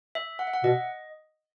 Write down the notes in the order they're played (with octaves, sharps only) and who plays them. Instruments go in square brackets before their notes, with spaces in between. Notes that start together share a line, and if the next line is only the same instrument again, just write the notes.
[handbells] E5
F#5
E5
F#5
[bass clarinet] B2 [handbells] D#5